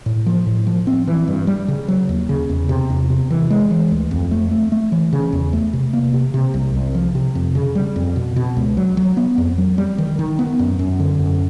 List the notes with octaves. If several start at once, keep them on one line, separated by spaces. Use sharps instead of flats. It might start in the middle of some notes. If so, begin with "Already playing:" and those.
A2
F3
A2
F3
C4
E3
G2
G3
C#3
F#3
D#2
C#3
E2
C3
E2
C3
E3
G#3
E3
D2
F2
A3
A3
A3
E3
C#3
E2
A3
C3
A#3
C3
C3
C2
C2
F3
C3
F2
C#3
G3
F2
B2
B2
C#2
F#3
F#3
B3
F2
F#3
G3
D#3
D#3
B3
F#2
F#2
D3
F#2